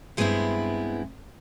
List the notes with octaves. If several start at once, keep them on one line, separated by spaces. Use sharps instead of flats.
G2 G#3 A3 B3 C4 E4